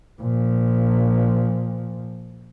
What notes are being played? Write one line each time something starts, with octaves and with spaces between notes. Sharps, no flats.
A#2 F3